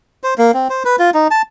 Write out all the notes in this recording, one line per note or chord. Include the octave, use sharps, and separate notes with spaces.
C5
A#3
C4
C5
B4
F4
D#4
A5